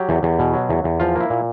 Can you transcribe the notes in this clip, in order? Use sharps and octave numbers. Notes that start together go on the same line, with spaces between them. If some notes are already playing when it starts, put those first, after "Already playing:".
Already playing: F#3 G4
E2
E2
B2
F#3
E2
E2
F3 F4
A#3 E4
A#2